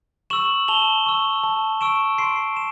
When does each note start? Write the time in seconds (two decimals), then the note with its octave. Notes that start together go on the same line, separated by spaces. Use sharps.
0.30 C#6 E6 E7 F#7
0.68 A5 F7 G7
1.06 C#6 E6
1.43 A5
1.81 C#6 E6 D7 E7
2.18 C6 C7 D7
2.57 E7